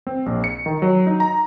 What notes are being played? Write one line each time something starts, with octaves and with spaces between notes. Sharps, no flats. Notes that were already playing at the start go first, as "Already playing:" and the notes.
C4
A#1
C#7
D#3
F#3
D#4
A#5